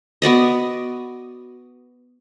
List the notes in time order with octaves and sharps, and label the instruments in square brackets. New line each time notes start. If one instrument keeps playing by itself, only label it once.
[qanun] B3 F#4 D5 D#5